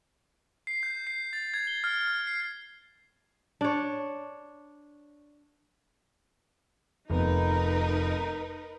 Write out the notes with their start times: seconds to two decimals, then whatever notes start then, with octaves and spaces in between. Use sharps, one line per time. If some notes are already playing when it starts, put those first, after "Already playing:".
0.67 C7
0.83 G6
1.07 C7
1.33 A6
1.54 G#6
1.67 G7
1.84 F6
2.07 F6
2.27 C7
3.61 D4 C#5
7.10 F1 B3 D#4 A#4 B4